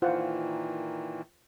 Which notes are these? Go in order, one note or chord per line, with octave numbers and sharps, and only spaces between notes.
A#2 D#3 E3 F4 C5 F#5